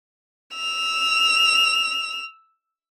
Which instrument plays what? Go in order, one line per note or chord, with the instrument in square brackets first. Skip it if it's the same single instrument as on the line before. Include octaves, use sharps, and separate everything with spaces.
[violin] E6 F7